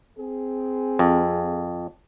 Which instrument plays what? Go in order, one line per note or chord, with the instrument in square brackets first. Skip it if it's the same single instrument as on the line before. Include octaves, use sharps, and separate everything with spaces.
[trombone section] C4 G#4
[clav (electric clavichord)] F2